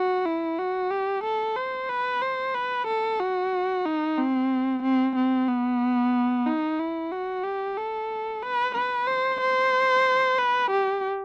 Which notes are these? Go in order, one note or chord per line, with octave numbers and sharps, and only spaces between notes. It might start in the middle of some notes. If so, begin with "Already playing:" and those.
Already playing: F#4
E4
F#4
G4
A4
C5
B4
C5
B4
A4
F#4
D#4
C4
C4
C4
B3
D#4
E4
F#4
G4
A4
B4
B4
C5
C5
B4
G4